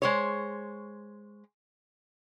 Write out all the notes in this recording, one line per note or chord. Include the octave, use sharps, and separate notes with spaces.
G#3 C5 C#5